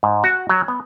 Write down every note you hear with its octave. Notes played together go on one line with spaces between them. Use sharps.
G#2
F#4
F#3
B3